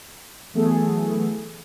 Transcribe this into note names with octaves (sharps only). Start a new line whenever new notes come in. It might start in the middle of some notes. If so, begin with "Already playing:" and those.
E3 F#3 A3 B3 G#4 A4